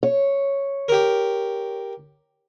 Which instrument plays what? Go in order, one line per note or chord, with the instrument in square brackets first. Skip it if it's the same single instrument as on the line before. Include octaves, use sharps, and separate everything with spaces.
[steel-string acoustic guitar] C#5
[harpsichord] G4 A#4